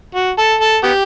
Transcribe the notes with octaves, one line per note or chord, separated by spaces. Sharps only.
F#4
A4
A4
B3 G4